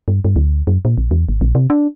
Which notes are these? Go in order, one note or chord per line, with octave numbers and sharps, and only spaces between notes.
G2
G2
D2
F#2
A#2
A#1
E2
G#1
A#1
C3
D4